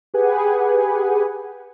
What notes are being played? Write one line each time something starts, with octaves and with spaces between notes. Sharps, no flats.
G4 G#4 B4 F#5 G#5